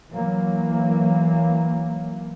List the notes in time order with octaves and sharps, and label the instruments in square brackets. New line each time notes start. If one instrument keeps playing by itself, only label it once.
[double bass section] E3 F#3 A#3